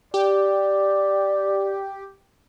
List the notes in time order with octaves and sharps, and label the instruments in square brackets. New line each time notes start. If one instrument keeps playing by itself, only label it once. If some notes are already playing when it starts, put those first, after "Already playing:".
[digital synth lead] G4 [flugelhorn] D5